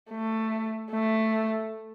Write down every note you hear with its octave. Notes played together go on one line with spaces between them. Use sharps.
A3
A3